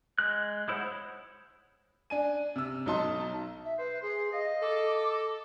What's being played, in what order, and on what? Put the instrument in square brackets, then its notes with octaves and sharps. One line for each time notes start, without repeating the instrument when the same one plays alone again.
[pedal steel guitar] G#3 F#6
G#3 E4 C5 C#5 F#5
[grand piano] D4 G#5 D#7
C3 E6
B1 F#3 D#4 A5 C6
[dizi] E5
[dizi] B4 [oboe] C5
[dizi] G#4 [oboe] C6
[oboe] D#5 [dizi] F5
[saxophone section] A4 [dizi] D6